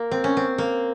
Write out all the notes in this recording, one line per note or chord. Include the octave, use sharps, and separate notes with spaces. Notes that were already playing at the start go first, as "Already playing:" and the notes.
Already playing: A#3
C4
C#4
C4
A#3